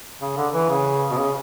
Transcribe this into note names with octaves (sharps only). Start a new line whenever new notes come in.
C#3
D3
E3
C#3
B2
C#3